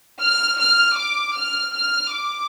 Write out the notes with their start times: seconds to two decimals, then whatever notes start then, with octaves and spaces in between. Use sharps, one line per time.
0.21 F6
0.59 F6
0.98 D6
1.37 F6
1.76 F6
2.15 D6